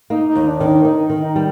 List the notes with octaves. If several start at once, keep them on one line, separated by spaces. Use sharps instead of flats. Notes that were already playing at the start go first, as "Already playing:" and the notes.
A#3 D#4
D#4
D#2
D4
D#3
D#4
D#3 D#4
D#3
D#4
G3